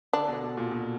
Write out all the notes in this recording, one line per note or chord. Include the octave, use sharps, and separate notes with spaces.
D3 D4
B2
B2
A#2
B2